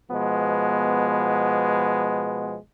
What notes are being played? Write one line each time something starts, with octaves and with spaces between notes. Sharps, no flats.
B2 F3 G#3 B3